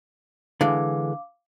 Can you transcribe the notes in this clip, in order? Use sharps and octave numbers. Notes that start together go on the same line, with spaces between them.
D3 E3 G#3 F5 D6